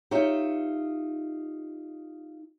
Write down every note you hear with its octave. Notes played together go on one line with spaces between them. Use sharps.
D#4 F4 G4 C#5 E5